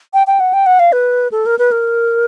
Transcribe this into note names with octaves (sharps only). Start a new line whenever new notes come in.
G5
G5
F#5
G5
F#5
F5
B4
A4
A#4
B4
A#4